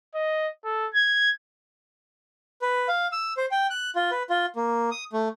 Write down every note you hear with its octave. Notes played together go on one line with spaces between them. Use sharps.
D#5
A4
G#6
B4
F5
E6
C5
G5
F#6
F4
B4
F4
A#3
D#6
A3